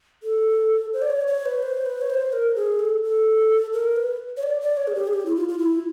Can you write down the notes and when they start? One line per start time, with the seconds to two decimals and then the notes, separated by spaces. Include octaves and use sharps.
0.23 A4
0.93 C5
1.02 D5
1.10 C#5
1.27 C#5
1.46 B4
1.63 C5
1.86 B4
2.01 C#5
2.10 C5
2.33 A#4
2.56 G#4
2.79 A4
3.03 A4
3.73 A#4
3.96 B4
4.37 C#5
4.43 D5
4.61 D5
4.77 C#5
4.87 G#4
4.95 G4
5.07 G#4
5.13 G4
5.26 E4
5.36 F4
5.49 F4
5.59 E4